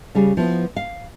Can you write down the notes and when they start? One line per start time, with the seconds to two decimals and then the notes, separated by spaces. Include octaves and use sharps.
0.15 C#3 G3 G#4
0.37 F3 B3 E4
0.76 F5